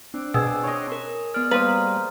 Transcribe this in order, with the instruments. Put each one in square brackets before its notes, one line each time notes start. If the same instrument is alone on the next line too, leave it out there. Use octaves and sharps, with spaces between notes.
[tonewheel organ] C4 D4
[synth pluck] B2 [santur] G#4 [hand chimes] E6
[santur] C#5 D#5
[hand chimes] A#4
[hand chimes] B3 F6 [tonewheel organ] D5
[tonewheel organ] G3 [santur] A#3 C5 D#5 [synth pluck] B4 [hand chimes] A#5 F6 A6